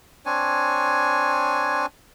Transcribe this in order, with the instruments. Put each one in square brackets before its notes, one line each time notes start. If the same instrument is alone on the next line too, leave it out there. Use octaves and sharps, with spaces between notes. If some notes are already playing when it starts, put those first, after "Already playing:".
[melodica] C4 D4 C#5 G#5